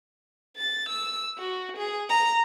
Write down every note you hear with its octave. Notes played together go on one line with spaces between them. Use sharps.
A6
E6
F#4
G#4
A#5